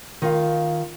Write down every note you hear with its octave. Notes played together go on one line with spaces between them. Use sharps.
D#3 F4 F5